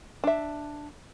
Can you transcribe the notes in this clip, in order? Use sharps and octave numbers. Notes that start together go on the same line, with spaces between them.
D4 E5